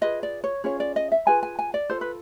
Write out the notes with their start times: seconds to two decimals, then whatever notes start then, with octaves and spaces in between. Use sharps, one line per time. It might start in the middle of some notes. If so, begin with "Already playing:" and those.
0.01 F4 G#4 B4 D#5
0.23 D5
0.44 C#5
0.64 C#4 F4 G#4 C#5
0.80 D5
0.96 D#5
1.12 E5
1.27 F4 G#4 B4 G#5
1.43 G#5
1.59 G#5
1.74 D5
1.90 F4 A4 C5
2.01 B4